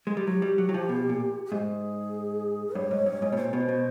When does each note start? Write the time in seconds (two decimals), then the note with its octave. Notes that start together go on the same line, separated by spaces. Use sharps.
0.07 G#3
0.17 G3
0.27 F#3 G4
0.42 G3
0.58 F#3
0.69 F#3
0.74 F3
0.89 B2
1.09 A#2
1.45 G4
1.51 G#2 G#4
2.75 G2 C#5
2.91 G#2
3.06 G2
3.22 G#2
3.32 B2
3.37 A#2 C5
3.45 C#5
3.53 B2 C5
3.68 B2